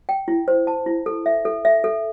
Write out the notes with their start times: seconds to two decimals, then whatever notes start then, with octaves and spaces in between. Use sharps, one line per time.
0.09 G5
0.28 E4
0.48 C5
0.67 A5
0.86 E4
1.06 A4
1.26 E5
1.45 A4
1.65 E5
1.84 A4